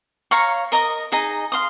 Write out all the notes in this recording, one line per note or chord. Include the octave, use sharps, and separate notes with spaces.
C#5 F5 A#5 C#6
A#4 D#5 A#5 D#6
D#4 G#4 D#5 A#5
F5 C6 D#6